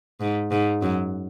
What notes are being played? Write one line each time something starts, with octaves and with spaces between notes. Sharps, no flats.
G#2
G#2
F#2